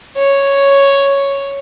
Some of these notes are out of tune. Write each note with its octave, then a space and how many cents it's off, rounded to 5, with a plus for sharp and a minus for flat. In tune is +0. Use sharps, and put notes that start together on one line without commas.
C#5 +0